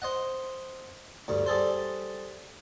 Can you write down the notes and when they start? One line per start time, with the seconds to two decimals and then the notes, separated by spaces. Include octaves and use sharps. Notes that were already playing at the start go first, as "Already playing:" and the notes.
0.02 C5 D#5 F#5
1.28 D2 G2
1.46 G3 G#4 A4 C5